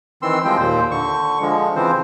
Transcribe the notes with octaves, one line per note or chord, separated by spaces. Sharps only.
D#3 E3 C4 C6 E6
F3 G3 G#3 C4 G5
D#2 A#2 C5
D3 C#6
D3 F3 G#3
C#3 E3 F3 C4 C5